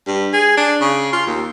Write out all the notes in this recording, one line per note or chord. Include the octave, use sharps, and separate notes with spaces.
G2
G#4
D4
C#3
F4
D#2